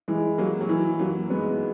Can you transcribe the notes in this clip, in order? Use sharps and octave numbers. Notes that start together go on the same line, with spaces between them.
E3 G#3
F#3 A#3
F#3
E3
F#3 A#3
G#3 B3